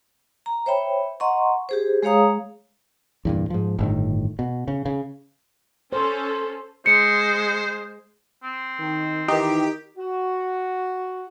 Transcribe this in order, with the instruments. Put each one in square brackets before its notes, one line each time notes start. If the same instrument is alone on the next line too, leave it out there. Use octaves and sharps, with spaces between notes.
[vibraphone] A#5
C5 C#5 E5 G5 B5
D#5 F#5 A#5 C6 C#6
G4 G#4 C5
G#3 G#4 C#5 F5 A#5 D#6
[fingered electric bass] E2 G2 A#2
G#2 F3
G1 A2 D#3
B2
C#3
C#3
[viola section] C#4 A4 [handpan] C5
[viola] G#3 [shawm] C5 [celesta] C#7
[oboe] C4
[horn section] D#3
[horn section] D#3 E3 [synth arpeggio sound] D#4 [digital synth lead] G4
[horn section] F#4